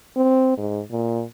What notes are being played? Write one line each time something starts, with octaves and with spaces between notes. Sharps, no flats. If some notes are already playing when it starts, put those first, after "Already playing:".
C4
G#2
A#2